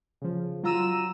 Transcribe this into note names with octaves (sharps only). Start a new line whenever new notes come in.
C#3 F3
F#3 F4 A#5 E6 D#7 E7